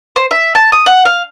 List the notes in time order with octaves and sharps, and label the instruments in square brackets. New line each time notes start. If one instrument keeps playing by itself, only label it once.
[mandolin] C5
E5
A5
D#6
F#5
F5